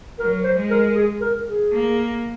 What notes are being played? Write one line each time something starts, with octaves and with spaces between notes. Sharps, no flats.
F#3 A#4
C5
G#3
A#4
G#4
A#4
G#4
A#3